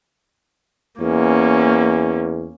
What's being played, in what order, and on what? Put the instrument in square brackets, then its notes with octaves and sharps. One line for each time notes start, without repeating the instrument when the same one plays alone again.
[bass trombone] E2 [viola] A#3 C#4